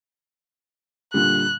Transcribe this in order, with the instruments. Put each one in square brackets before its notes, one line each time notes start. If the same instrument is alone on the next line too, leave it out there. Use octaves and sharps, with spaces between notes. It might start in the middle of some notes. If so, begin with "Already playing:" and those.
[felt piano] A#2 D3 G3 [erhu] F#6